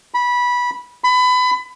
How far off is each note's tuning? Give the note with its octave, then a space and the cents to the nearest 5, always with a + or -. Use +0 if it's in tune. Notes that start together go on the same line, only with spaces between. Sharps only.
B5 -15
B5 +25